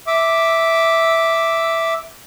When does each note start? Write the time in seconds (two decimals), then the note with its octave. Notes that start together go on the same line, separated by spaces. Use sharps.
0.07 E5 D6